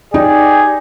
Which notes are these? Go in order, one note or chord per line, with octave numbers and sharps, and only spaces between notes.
D#4 G4 G#4 D5